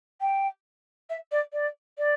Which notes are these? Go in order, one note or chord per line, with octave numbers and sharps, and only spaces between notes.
G5
E5
D5
D5
D5